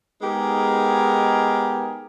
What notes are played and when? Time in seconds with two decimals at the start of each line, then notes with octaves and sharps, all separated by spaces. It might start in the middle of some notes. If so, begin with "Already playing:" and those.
0.21 G#3 B3 D#4 G4 G#4 A#4